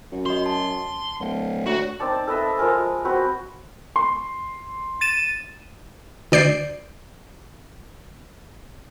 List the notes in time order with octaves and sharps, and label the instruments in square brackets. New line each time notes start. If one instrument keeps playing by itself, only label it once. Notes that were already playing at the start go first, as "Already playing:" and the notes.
[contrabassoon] F#2
[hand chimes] F#4 D#5 [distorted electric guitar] C6
[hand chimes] A5
[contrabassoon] D1
[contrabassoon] D2 [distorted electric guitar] F#4 [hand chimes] C#5
[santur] C4 D#4 D5 A5
A4 B4 D#5 E5
F3 G#3 A#4 G#5
C4 F#4 B4
[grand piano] C6
[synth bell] A6 D#7 E7
[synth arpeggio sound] D2 D5 G6 C7